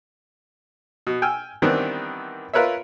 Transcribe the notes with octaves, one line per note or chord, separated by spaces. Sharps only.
B2
G5 G#5 E6 F6
D#3 E3 G3 B3 C4 D4
F4 A#4 B4 C#5 E5